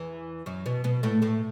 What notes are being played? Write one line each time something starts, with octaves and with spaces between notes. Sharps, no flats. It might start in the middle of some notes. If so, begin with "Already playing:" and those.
Already playing: E2 E3
F#2 F#3
B2 B3
B2 B3
A2 A3
A2 A3